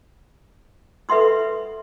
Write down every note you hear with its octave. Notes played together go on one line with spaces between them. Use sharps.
A4 B4 E5 F#5 C6 D#6